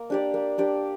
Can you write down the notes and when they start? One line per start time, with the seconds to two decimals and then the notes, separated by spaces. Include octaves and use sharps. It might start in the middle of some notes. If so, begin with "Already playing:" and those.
Already playing: A#3
0.10 D4 G4 D5
0.34 A#3
0.58 D4 G4 D5